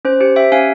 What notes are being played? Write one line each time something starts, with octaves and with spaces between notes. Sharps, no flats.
C#4 C5
G4 C5
G4 E5 G5
C#4 F5 G#5